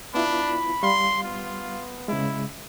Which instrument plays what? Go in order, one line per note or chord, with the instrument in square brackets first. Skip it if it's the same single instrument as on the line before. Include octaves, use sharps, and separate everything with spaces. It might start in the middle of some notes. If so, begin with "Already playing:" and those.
[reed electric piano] B3 E4 F4 [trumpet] D4 [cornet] B5
[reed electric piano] G3 F5 [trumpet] C6
[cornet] B3 [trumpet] F4
[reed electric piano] C#3 G#3 [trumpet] E4